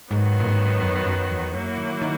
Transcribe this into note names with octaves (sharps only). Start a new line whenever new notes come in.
G#2 D#3 F#3 B3
A#2
G#2
F#2
F#2
E2
F#2 F#3 A#3 E4
D#3
D#3